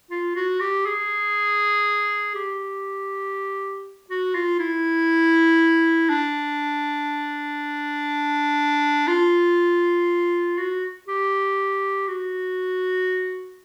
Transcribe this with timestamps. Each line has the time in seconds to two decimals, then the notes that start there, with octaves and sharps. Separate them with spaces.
0.11 F4
0.36 F#4
0.60 G4
0.86 G#4
2.35 G4
4.10 F#4
4.35 F4
4.59 E4
6.10 D4
9.08 F4
10.58 F#4
11.08 G4
12.08 F#4